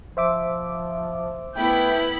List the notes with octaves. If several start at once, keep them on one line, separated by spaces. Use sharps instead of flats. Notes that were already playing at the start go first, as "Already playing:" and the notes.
F3 C5 E5 D6
A3 B3 E4 G5 B5